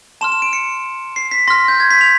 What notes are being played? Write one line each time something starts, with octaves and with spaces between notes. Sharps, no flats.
A5 C6 F6 E7
E7
D7
C#7
C7
B6
C6 F6 A#6
G6
G#6
B6
F7